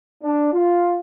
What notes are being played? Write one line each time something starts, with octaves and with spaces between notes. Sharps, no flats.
D4
F4